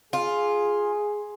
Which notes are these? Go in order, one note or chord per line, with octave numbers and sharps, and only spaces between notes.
F4 G#4